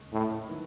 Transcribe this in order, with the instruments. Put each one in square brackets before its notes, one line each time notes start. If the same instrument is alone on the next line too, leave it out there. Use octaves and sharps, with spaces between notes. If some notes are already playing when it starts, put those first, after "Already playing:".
Already playing: [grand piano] D#2 C#3 G#3
[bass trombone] A2
[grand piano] D#3 F#3 B3 E4